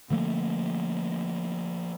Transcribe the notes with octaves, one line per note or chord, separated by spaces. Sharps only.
D3 F3 A3 A#3